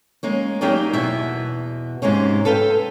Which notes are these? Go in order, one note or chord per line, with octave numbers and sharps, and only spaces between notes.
G#3 A#3 C#4
F#3 A#3 D#4 G4 G#4 D5
E2 B2 E5
G#2 C3 G#3 A#3 C#4
A4 B4 F5 G5